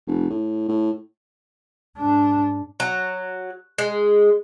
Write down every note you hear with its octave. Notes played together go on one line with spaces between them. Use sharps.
F1
A2
A2
G#2 D4
F#3
G#3